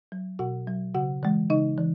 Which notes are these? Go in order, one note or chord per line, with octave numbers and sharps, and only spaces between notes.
F#3
B2 F#4 F#5
F#3
C#3 F#4 F#5
E3 G#3
C#3 D#4 D#5
E3